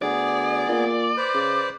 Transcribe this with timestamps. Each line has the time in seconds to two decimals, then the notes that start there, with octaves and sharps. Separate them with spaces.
0.02 D2 B3 G#4 D5
0.68 A#2
1.17 B4 C5
1.34 C#3